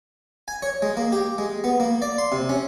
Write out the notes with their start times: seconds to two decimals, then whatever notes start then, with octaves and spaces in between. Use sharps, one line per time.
0.48 G#5
0.62 C#5
0.82 G#3
0.97 A#3
1.12 G4
1.38 G#3
1.64 B3
1.80 A#3
2.02 D5
2.18 C6
2.32 C3
2.49 C#4